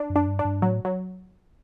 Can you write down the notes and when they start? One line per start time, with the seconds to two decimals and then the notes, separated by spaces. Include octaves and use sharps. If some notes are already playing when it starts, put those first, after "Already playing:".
Already playing: D4
0.10 F#2
0.16 D4
0.27 G2
0.39 D4
0.45 G2
0.62 A2 F#3
0.85 F#3